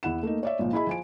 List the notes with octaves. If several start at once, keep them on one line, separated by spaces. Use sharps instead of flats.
E2 E4 F#5 E7
A3 A#3 D#4
C#5 D5 E5
G#1 A#2 F3
E4 G#4 D#5 B5
F3 G#5 D7